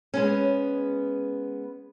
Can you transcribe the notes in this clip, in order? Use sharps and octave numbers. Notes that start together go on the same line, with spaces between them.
G#3 B3 C#4